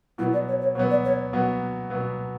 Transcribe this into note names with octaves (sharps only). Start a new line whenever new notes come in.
B2 F#3 B3 E4
D5
C#5
C#5
B2 F#3 B3 C#5
D5
C#5
B2 F#3 B3
B2 F#3 B3